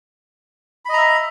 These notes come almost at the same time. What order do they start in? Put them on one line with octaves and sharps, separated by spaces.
B5 D#5 A#5 E5